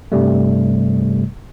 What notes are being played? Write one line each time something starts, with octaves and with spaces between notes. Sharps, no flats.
G2 C3 G3 A3